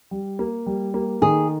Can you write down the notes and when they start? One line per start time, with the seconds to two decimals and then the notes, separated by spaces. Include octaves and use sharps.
0.11 G3
0.39 A#3
0.66 G3
0.94 A#3
1.22 D#3 G#4